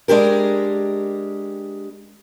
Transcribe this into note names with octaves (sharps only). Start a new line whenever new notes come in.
G#3 D4 G4 A#4